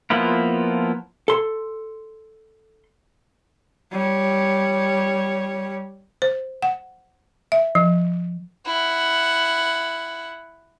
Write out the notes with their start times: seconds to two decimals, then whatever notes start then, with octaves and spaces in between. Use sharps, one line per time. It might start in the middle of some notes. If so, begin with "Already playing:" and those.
0.10 F3 A#3 B3 E4 F4
1.28 A4 C6
3.92 G3 C#5
6.22 C5
6.62 F#5
7.52 E5
7.75 F3
8.66 E4 F#5